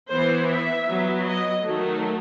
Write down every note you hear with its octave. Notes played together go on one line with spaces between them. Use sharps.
E3 B3 C5
E5
F#3 B3
D#5
D#3 F#3 A3